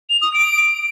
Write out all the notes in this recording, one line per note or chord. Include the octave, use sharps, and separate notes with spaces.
F7
D#6
D7